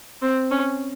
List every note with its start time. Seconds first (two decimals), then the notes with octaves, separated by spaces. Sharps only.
0.22 C4
0.51 C#4